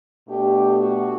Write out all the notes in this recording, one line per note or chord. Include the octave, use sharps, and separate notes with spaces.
B2 A3 D4 G4
F#4